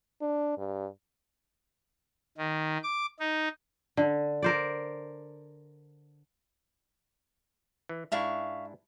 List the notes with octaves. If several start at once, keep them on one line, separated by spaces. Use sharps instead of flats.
D4
G2
D#3
D6
D#4
D3
A#4 C5 D5
E3
G#2 D4 E4 E5 F5 C#6